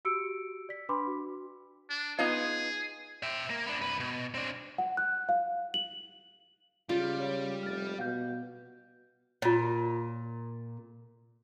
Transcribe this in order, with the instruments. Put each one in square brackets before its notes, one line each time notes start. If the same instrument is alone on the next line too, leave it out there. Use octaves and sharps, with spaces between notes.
[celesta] F#4 G4 E6 C#7 D7
D5 B6
D4 B4 B5 C6 D6
F#4
[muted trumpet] D4
[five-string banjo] B3 D#4 F4 [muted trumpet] G#4
[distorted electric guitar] E5 G5
A#3
B3 D4
C2 B4
B2
C4 D4
[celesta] F#5
F#6
F5
F#7
[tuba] C#3 [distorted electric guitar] G3 [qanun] F4
[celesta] C#5 F5
[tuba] F1 [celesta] F6 A6
[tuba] B2 [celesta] F5 F#5 G6
[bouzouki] A#2 [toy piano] F4 C#5